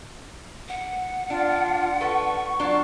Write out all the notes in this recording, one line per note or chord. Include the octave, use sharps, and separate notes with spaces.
F#5
D4 F4
A4 B4 C#6
F#3 D4 F4